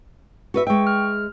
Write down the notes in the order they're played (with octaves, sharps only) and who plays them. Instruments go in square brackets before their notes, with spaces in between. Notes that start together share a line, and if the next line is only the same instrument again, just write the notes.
[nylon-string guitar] F#4 B4 E5
[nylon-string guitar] G#3 E5 [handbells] G5 C#6
[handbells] F6